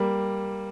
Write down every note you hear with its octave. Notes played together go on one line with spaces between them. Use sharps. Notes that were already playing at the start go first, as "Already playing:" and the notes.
Already playing: G3 A#3